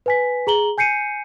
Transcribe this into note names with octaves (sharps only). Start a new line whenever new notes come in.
B4 G#5 B6
G#4 A#5 F#7 G7
G#5 G6 C7 C#7 D#7